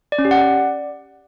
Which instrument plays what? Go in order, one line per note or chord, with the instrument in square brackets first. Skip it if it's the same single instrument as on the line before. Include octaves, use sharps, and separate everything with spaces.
[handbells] D5
C#4
G4
F#5
D5